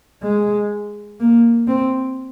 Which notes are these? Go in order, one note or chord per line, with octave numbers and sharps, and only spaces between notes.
G#3
A#3
C4